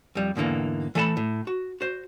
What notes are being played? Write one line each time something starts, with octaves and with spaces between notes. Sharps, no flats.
F2 G3
E2 G#2 D3 E3 A#3
E3 A3 A4 D#5 A5 B5
A2
F#4
F#4 C5